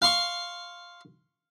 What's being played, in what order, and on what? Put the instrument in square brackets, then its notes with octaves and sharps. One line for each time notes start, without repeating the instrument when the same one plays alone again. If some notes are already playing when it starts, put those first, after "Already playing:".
[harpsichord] F5 C6 C#6